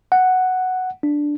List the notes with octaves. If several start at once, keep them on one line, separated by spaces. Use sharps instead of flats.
F#5
D4